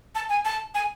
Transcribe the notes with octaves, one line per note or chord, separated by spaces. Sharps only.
A5
G#5
A5
G#5